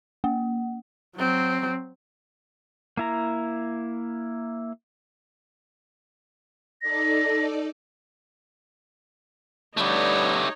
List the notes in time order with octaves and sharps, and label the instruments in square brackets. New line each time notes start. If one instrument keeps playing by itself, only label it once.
[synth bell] A#3
[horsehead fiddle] F#3 C4
[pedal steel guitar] A#3 E4 A#5
[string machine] D#4 A4 D5 [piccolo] A#6
[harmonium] D3 G3 B4 [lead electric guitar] A3 G4 [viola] D#4 C#5